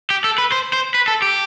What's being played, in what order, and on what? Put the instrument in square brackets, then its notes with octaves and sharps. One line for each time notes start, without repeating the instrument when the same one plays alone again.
[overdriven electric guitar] G4
A4
B4
C5
C5
B4
A4
G4